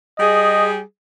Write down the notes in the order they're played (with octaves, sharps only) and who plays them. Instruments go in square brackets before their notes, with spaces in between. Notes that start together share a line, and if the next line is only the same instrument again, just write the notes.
[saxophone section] G3 G#4 [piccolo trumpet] D#5